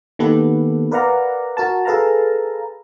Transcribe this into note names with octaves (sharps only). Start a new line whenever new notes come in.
D#3 A#3 B3 G4 A4 B4
A#4 B4 D5 F5 F#5 A#5
F#4 A#4 A5
G#4 A4 B4 F5 A5 A#5